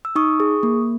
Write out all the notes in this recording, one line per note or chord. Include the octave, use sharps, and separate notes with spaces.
E6
D#4 C#6 D#6
G#4
A#3